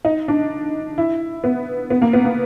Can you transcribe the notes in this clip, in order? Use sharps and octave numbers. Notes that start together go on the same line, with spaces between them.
D#4
D4
E4
B3
B3
A#3
B3
A#3